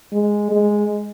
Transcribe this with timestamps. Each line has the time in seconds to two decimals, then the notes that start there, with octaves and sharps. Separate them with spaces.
0.13 G#3
0.51 G#3